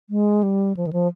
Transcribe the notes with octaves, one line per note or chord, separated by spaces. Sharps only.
G#3
G3
F3
D#3
F3